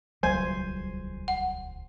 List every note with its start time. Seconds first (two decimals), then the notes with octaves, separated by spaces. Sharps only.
0.23 D#1 C#2 F#3 G3 C5 G#5
1.28 F#5